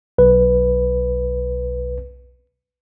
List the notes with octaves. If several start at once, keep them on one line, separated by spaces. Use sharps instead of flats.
B1 B4